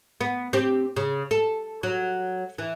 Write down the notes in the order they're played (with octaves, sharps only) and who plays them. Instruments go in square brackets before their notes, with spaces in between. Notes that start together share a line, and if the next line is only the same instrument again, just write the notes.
[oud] B3
C4 G4
C#3
A4
F#3
E3